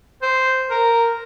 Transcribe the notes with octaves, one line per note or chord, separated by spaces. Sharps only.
C5
A#4